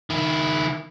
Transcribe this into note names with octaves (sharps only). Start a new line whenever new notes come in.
D#3 E4